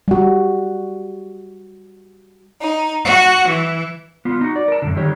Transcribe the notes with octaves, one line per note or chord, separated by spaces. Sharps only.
G3 F#4
D#4
F#4
E3
B3 F4
D#4 F#4
D5
A#4 A5
F#2 B2 D3
D3 D#3 G4 C#5